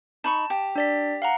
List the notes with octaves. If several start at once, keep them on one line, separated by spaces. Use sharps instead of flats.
D#4 A5 B5 C#6
G4
D4 D5 B6
F5 F#5 A#5